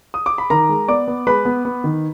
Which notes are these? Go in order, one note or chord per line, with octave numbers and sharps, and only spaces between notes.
D#6
D6
B5
D#3 A#4 A#5
G#3
B3 D5 D6
B3
G#3 B4 B5
B3
B3
D#3